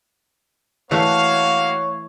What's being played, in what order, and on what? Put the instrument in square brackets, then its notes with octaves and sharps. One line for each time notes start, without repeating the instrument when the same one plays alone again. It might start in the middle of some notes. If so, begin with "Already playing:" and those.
[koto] E3 A3 [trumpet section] A#3 F#4 F5 [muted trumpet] C#5